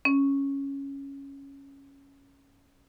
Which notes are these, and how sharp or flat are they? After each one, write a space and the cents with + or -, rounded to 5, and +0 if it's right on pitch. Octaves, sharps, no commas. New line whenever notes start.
C#4 -5